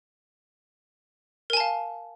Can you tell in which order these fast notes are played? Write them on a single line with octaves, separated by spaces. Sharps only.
A#4 G#5 A5 F5